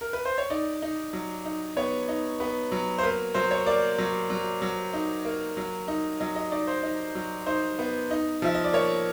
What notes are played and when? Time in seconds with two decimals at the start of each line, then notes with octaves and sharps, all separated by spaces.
0.01 A#4
0.13 B4
0.25 C5
0.38 C#5
0.50 D#4 D5
0.82 D#4
1.13 F#3
1.45 D#4
1.76 B3 C#5
2.08 D#4
2.40 B3
2.72 F#3
2.98 C5
3.03 A#3 B4
3.34 F#3 C5
3.51 C#5
3.66 A#3 D5
3.98 F#3
4.30 F#3
4.62 F#3
4.93 D#4
5.25 A#3
5.57 F#3
5.88 D#4
6.20 F#3 D#5
6.36 D#5
6.51 D#4 D5
6.67 C5
6.83 D#4
7.15 F#3
7.46 D#4 C5
7.79 B3
8.11 D#4
8.42 F3 E5
8.54 D#5
8.64 D5
8.73 A#3 C#5